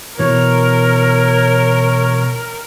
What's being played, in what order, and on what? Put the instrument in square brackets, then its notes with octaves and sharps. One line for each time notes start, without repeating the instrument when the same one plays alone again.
[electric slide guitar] B2 E3 [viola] A#4 [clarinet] C#5